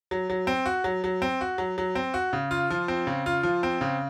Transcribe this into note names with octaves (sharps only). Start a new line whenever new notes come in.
F#3
F#3
C4
F#4
F#3
F#3
C4
F#4
F#3
F#3
C4
F#4
C#3
F4
F3
C4
C#3
F4
F3
C4
C#3